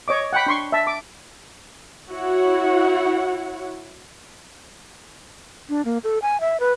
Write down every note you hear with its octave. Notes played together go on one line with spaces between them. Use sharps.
C#5 D#5 D6
F#5 G5 B5
D4 C6 C#6
E5 A5
D6
E4 F#4 C#5 F#5
D4
A#3
A4
G#5
E5
B4